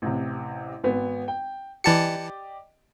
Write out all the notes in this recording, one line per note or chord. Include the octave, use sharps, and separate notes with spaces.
A1 C3
G#1 B3
G5
E3 G4 D5 D#5 A5 C#7